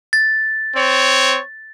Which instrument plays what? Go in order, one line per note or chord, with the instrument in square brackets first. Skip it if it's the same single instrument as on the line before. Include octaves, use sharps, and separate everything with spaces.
[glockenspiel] A6
[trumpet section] C4 C#5